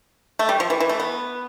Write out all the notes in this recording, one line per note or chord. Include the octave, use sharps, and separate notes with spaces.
A3
G3
F3
E3
E3
A3
B3